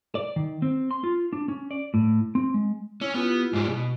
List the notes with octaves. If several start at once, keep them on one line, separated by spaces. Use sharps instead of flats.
D5
D#3
C4
C6
F4
D4
C#4
D5
A2
C4
G#3
C#4 E4
B3 E4 F4 G4
G#2 G3 G#3
B2